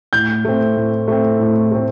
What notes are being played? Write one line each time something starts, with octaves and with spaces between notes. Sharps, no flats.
A2 G6
A3 C4
A2
A3 C4
A2
A3 C4